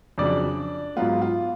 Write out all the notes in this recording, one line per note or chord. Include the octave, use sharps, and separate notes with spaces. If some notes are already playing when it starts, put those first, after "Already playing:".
F2 C#3 F#3 D4 D5
G#2 F#3 B3 F4
F4